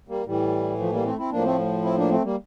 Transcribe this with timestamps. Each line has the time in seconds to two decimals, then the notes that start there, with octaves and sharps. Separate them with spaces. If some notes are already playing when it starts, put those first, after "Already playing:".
0.08 G3 A#3
0.26 A2 E3 G3
0.79 F3 A3
0.92 G3 A#3
1.05 A3 C4
1.18 C4 E4
1.31 A2 F3 A#3 D4
1.44 A3 C4
1.84 C4 E4
1.98 A#3 D4
2.10 A3 C4
2.24 G3 A#3